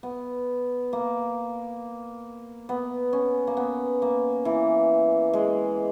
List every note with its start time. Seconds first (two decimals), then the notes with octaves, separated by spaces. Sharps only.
0.03 B3
0.93 A#3
2.69 B3
3.13 C#4
3.47 A#3
3.57 B3
4.02 A#3
4.45 E3
5.33 G#3